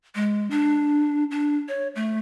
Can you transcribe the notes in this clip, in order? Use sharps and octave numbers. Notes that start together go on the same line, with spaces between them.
G#3
D4
D4
C#5
A3